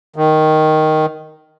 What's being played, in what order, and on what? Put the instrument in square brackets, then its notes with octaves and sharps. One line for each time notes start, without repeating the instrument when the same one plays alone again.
[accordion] D#3